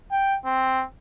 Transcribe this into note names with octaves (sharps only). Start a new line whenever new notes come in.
G5
C4